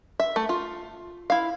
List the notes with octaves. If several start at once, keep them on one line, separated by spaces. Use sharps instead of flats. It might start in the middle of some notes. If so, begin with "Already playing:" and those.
E5
A3
F4
E4 F5